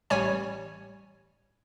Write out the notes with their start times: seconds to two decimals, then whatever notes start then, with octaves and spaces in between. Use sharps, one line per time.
0.10 A1 G3 C#5 G#5